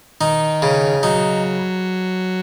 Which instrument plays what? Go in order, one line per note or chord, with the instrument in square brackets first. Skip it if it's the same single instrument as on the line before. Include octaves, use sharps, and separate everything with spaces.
[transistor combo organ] D#3 [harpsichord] D#4
[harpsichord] C#3
[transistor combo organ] F#3 [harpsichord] D#4